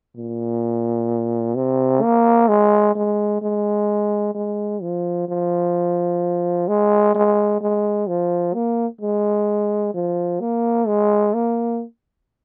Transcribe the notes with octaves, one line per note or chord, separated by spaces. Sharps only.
A#2
C3
A#3
G#3
G#3
G#3
G#3
F3
F3
G#3
G#3
G#3
F3
A#3
G#3
F3
A#3
G#3
A#3